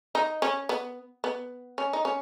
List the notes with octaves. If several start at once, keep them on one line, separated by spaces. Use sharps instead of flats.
D#4
C#4
B3
B3
C#4
D#4
C#4